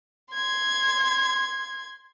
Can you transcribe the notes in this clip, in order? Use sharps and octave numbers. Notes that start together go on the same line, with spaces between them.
C6 G#6